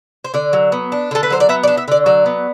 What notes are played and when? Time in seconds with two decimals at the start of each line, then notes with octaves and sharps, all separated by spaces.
0.24 C5
0.34 D3 D5
0.53 F#3
0.72 B3
0.92 D4
1.11 D3 A4
1.23 B4
1.30 F#3 C5
1.40 D5
1.49 B3 E5
1.63 D5
1.68 D4
1.77 E5
1.88 D3 D5
2.06 F#3 D5
2.26 B3